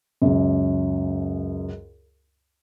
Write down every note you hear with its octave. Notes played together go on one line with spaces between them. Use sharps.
C#2 F#2